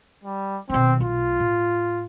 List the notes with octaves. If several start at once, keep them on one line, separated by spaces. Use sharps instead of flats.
G3
B2 D#3 C4
B1 A3 F4
A2